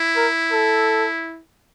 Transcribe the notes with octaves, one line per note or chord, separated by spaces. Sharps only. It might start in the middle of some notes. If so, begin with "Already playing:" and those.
Already playing: E4
A#4
A4